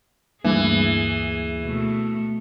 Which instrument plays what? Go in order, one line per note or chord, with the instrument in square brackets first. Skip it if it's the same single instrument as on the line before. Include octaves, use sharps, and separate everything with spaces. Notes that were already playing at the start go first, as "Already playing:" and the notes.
[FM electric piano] D2 G2 [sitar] E3 [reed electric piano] A#3 [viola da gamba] G#4
[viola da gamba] B2 A3